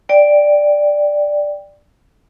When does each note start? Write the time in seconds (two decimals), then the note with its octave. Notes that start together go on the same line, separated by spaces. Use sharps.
0.09 D5 G5